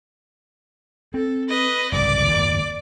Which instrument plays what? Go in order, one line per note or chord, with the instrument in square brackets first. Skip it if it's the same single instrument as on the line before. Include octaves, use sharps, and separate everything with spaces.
[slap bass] C4 [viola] A4
[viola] B4 D#5
[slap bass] F#1 C2 G#2 [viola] D5 D6
[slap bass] F#1 D#2 G#2